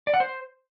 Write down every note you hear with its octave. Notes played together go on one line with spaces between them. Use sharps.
D5
F#5
C5